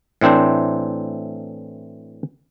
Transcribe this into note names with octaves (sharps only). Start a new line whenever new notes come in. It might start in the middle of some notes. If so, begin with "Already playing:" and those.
A2 E3 C4 D4 C5